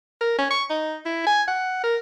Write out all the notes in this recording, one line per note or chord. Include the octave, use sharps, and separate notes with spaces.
A#4
C#4
C#6
D#4
E4
G#5
F#5
A#4